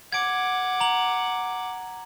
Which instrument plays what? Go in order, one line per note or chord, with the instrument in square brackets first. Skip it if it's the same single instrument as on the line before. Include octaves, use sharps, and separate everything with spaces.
[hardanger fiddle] F#5 D6 [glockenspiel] G#6 D7
[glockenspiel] A#5 F#7